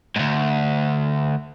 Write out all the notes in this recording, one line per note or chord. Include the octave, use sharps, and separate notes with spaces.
D2 G#2